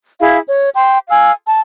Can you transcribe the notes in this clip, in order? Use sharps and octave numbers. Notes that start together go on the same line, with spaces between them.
E4 G#4 F5
C#5
G5 C6
F5 G#5 E6
A5